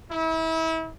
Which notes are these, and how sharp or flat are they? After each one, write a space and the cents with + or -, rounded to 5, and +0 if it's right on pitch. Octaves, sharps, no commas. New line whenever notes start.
E4 -35